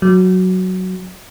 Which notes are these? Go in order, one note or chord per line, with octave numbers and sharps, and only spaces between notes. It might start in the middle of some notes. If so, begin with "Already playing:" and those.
F#3